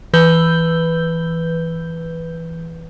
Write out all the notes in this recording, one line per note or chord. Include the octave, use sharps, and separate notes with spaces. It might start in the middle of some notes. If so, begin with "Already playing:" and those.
E3 B4 G6 G7